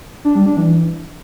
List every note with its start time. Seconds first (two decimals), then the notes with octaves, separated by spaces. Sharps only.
0.25 D4
0.35 G3
0.46 D4
0.57 E3